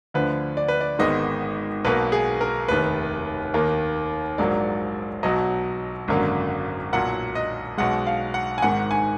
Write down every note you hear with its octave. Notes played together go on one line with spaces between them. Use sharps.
D2 D3 F3 B4
D5
B4
D5
G#1 G#2 D#3 G#3 B3 D#5
B1 B2 A#3 B4
G#4
A#4
F1 D#2 D#3 B4
D#2 D#3 A#3
A#1 G#2 F#3 A#3 D5
B1 B2 F#3 D#5
G#1 F#2 D3 F#3 A#3
B1 A#2 F#3 F#5
D#5
B1 B2 G#3 F#5
F5
F#5
G#5
G#1 G#2 D#3 F#5
G#5